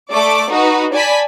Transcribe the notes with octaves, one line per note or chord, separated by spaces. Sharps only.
A3 D5 D6
D#4 F#4 B4
D5 G#5 A5 B5 B6